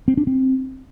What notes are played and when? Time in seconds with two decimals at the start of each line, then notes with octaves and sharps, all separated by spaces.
0.08 C4
0.17 D4
0.27 C4